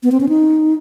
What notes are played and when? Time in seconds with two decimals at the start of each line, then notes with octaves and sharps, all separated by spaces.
0.03 B3
0.12 C4
0.20 C#4
0.29 D#4